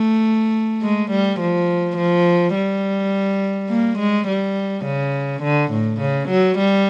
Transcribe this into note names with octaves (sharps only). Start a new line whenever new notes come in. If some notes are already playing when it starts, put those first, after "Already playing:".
Already playing: A3
G#3
G3
F3
F3
G3
A#3
G#3
G3
C#3
D3
A2
C#3
F#3
G3